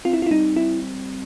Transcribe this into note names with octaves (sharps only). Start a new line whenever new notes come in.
C4 F4
E4
F4
E4
G3 D#4
C4 E4